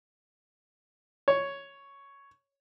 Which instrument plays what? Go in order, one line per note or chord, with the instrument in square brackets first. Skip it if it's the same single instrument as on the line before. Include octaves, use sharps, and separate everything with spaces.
[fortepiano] C#5